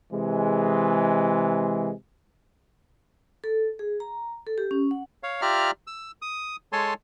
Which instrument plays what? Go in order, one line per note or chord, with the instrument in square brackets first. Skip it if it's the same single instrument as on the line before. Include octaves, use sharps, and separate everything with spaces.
[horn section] C3 E3 G#3
[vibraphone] A4
G#4
A#5
A4
G4
C#4
F#5
[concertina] C#5 F5
F4 G4 D5 E5 A#5 F6
E6
D#6
G#3 A4 C#5 G#5 A5 C6